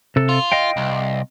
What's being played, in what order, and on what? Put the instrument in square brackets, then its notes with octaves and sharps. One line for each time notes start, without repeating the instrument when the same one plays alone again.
[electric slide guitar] C3 A4
[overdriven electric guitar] F4
[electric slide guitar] D#5 F5 G5
[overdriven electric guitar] C2